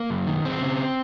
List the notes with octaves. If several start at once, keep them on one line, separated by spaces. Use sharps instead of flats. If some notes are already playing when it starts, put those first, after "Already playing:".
Already playing: A#3
F#2
D#3
F#2 C4
C#3